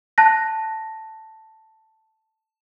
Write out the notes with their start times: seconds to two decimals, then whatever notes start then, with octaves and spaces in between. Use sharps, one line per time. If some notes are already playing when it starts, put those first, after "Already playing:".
0.18 A5 F#6 A#6